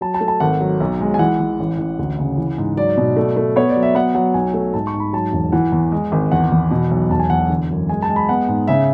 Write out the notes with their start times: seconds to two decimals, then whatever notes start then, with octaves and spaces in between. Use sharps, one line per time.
0.01 F#3 A5
0.14 A5
0.21 A3
0.28 A5
0.40 G#1 F#5
0.61 F#3
0.80 B1
1.01 G#3
1.14 G#5
1.19 E3 F#5
1.40 E3
1.60 A1
1.78 A1
1.99 D2
2.19 C#3
2.38 E3
2.58 G#2
2.77 F#3 D5
2.97 B2
3.17 A3
3.36 A3
3.56 B3 C#5
3.69 D5
3.76 F#3
3.83 E5
3.95 B3 F#5
4.15 F#3 F#5
4.34 B1 G#5
4.54 A3
4.74 G#2 A5
4.87 C#6
4.94 G#2
5.00 B5
5.13 F#3 A5
5.33 E1
5.52 E3 F#5
5.72 E2
5.92 G#3
6.12 G#1
6.32 E2 F#5
6.52 E2
6.71 B2
6.91 B1
7.10 E1 A5
7.20 G#5
7.30 E2 F#5
7.40 G#5
7.50 D3
7.70 F#2
7.89 G#3 G#5
8.02 A5
8.10 G#3
8.16 B5
8.29 B3 F#5
8.48 G#2
8.67 C#3 E5